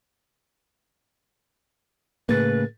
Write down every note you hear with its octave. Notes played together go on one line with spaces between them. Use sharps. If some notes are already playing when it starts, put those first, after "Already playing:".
A2 C#3 A3 A#3 G#4 B4 A6